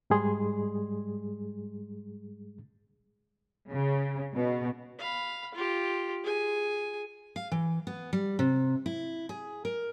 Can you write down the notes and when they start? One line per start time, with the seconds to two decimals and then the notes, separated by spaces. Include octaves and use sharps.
0.10 G#2 G3 G#3 G#4 C6
3.71 C#3
4.33 B2
4.99 F5 B5
5.54 F4 G4
6.23 G#4 G#5
7.36 F5
7.52 E3
7.87 B3
8.13 G3
8.39 C3
8.86 E4
9.29 G#4
9.65 A#4